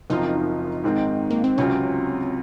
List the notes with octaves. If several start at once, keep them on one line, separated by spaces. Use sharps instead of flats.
F#1 F#2 F3 C4 D#4 F4
G#2 D#3 G#3 C4
A#3
C4
C#2 C3 F#3 C4 C#4 F4